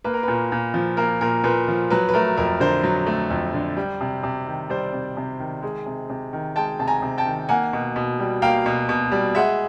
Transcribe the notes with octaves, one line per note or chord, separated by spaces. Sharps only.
A#3 B4
A#4
A#2 B4
A#2
F3
A#3 A#4
A#2 A#4
A#2 B4
F3
F#3 B4
B4
A3 A#4
F2 A#4
D3 A#4 C5
F#3
A3
F2
D3
G3
C3
C3
D#3
G3 C5 D5
C3
C3
D#3
G#3
C3
C3
D#3
G#3 G5 A5
C3 A5
G#5 A#5
C3
G5 A5
D#3
A#3 F#5 G#5
B2
B2
G3
A#3 F5 G5
B2
B2
G3
G#3 E5 F#5